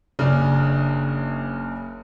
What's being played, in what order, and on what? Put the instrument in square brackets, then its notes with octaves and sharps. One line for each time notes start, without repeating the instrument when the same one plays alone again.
[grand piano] F#1 C#3 C#4 D4